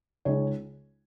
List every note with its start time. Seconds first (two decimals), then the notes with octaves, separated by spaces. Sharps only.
0.25 C#2 C#3 G#3 D#4 C#5